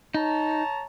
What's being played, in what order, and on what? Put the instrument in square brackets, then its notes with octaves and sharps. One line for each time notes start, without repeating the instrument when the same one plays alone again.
[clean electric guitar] D#4 [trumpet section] C#5 A5 A#5